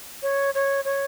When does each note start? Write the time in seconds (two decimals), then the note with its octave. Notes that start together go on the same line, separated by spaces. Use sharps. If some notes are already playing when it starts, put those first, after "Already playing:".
0.23 C#5
0.55 C#5
0.85 C#5